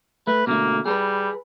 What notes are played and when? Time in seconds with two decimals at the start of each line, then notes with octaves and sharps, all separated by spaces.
0.27 A3 B4
0.47 B2 D3 A3 A#3
0.86 G3 G#4 A4 B4